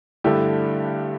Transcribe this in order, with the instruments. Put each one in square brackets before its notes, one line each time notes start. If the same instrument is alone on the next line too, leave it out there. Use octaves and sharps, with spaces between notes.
[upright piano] G2 D3 A3 E4 G4